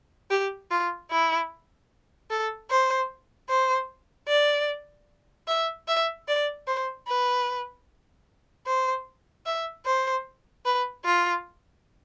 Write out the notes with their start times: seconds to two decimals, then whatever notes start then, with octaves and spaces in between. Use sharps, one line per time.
0.31 G4
0.71 F4
1.11 E4
2.30 A4
2.70 C5
3.49 C5
4.28 D5
5.48 E5
5.88 E5
6.28 D5
6.67 C5
7.07 B4
8.66 C5
9.46 E5
9.86 C5
10.65 B4
11.05 F4